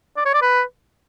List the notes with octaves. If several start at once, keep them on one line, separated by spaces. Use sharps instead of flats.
D5
C#5
D5
B4